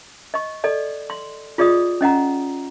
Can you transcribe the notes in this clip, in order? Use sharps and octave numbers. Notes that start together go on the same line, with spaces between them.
D#5 C#6
A4 D5 D#5
C6
F4 G#4 D5 D#5 D#6
C#4 D#5 F#5 A#5